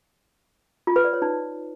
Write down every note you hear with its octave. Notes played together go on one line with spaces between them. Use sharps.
F4
B4
D5
C#5
D#4